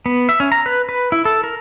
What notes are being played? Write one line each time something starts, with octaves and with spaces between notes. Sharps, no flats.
B3
E5
C#4
A#5
B4
B4
E4
A4
A#4